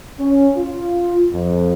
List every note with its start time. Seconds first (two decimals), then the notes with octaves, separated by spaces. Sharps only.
0.19 C#4
0.57 F4
1.33 F2